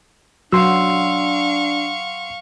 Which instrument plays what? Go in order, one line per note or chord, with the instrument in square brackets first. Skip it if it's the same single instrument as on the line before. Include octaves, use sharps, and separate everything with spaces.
[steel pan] F#3 F#4 [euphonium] D4 [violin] F5 C#6 [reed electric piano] F#5 C6 E6